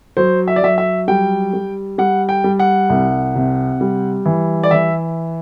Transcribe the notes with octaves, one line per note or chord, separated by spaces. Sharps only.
F#3 C5
E5
D5
F#3 E5
E5
G3 G5
G3
G3 F#5
G5
G3
F#5
C2
C3
G3
E3
D5
E3 E5